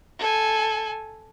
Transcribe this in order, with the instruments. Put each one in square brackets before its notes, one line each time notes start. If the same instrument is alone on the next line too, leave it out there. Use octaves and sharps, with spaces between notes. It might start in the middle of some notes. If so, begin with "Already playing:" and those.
[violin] A4 G#5